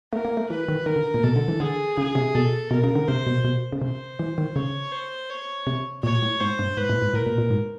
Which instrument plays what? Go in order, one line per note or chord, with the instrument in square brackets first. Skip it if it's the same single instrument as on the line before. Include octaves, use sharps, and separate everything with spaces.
[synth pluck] A3 [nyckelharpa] A#4
[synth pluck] A#3
A3
[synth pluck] E3 [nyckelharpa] B4
[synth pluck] D#3
[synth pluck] D#3 [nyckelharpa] A#4
[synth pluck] D3
A#2
[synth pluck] B2 [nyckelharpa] A4
[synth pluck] D3
E3
[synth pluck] D3 [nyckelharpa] G#4
[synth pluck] C#3 [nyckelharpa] G#4
[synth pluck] C3
[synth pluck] B2 [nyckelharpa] A4
[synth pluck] B2 [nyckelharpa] A#4
[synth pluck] C#3
D3
[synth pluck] C3 [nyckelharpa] C5
[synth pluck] B2
B2
C#3
[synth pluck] C3 [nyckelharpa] C5
[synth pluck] E3
D#3
[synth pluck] C#3 [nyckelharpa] C#5
[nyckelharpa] C5
C#5
[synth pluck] C3
[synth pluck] A#2 [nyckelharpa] C#5
[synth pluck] A2
[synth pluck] G#2 [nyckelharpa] C5
[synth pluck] G2
[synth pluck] G#2 [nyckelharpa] B4
[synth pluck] A2
G#2
[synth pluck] A2 [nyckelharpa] A#4
[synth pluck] A#2
A#2
G#2